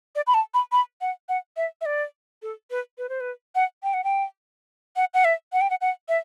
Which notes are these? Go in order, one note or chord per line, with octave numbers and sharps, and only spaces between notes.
D5
B5
A5
B5
B5
F#5
F#5
E5
E5
D5
A4
B4
B4
C5
B4
F#5
G5
F#5
G5
F#5
F#5
E5
F#5
G5
F#5
F#5
E5